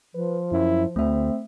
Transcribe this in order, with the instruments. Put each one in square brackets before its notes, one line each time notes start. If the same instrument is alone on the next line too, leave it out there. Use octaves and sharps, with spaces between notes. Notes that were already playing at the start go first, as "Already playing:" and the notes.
[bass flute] F3 [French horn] B4
[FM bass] F#2 [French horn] E4
[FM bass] D2 [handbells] A3 E5 [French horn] C4